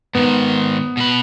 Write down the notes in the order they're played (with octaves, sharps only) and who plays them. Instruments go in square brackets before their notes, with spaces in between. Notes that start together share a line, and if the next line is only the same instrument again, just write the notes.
[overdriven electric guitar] G#2 D#3 [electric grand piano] B3
[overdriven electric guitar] B2 B4